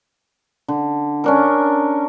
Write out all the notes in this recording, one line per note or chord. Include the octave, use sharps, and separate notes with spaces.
D3
C#4 D4 A#4